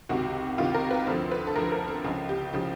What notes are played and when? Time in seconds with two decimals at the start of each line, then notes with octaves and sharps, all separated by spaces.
0.09 C#2 C3 D#3 F#4
0.58 C#2 C3 D#3 F4
0.74 A#4
0.91 B4
1.07 D2 D3 F3 C5
1.32 B4
1.47 A4
1.56 D2 D3 F3 A#4
1.72 A#4
1.88 A4
2.04 C#2 C#3 F3
2.29 G4
2.53 C#3 F3 G4